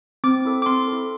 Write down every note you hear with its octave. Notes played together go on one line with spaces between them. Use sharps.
C4 D6
E4 A4
D6
C4 C6
E4 A4